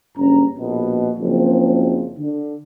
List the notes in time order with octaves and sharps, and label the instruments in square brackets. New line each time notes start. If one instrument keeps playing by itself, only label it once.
[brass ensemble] F#1 G2 C#4 A#5
A#1 B2
F#1 F3 C4
D3